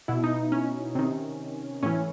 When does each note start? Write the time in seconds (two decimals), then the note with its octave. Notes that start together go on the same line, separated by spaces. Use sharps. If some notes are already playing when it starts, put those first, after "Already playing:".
0.08 B2 E4
0.24 D#4
0.52 C#4
0.95 C3 D#3
1.83 A2 E3 C#4